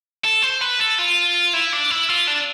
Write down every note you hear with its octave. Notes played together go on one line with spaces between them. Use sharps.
A4
C5
B4
A4
F4
E4
D4
E4
F4
D4